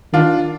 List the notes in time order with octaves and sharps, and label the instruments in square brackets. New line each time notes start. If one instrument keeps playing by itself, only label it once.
[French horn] D#3 [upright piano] D4 F4